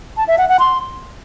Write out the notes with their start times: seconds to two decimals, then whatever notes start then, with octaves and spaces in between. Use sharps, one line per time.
0.17 A5
0.28 E5
0.38 F#5
0.49 F#5
0.60 C6